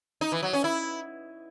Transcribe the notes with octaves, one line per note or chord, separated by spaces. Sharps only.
D#4
E3
F#3
C#4
E4